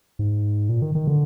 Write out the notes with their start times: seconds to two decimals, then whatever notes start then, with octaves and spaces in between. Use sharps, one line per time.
0.19 G#2
0.69 A#2
0.82 D#3
0.95 D#3
1.07 D3